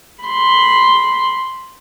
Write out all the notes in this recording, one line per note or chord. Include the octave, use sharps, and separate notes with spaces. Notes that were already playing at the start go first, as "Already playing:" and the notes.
B5 C6